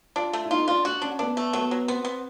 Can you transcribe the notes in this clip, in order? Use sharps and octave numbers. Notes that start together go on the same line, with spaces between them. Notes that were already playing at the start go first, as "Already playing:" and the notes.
D4 F4
A3
E4
D#4 F4
D4 F4
D4 F#4
C#4 D4
B3 D4
A3
F#3 B3
F#3
B3 C4
B3